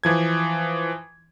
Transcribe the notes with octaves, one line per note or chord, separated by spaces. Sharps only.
E3 F3 G#6